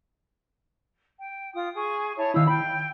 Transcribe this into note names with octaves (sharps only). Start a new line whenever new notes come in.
G5
F4 D#6
G#4 C#6
E4 C#5 A5
D#3 E4 F5 E6
G5 B5